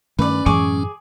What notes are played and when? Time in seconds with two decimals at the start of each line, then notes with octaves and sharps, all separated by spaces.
0.19 G2 D#3 A3 C#4 B4 D5
0.46 F#2 A2 E3 G#3 G#4 C#6 D6